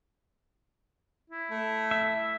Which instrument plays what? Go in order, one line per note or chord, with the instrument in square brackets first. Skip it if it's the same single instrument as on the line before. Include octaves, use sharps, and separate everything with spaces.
[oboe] E4
[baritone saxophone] A3
[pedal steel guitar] E5